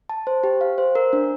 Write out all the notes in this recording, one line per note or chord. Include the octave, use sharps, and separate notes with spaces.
A5
C5
G4
F5
C5
A#4
D4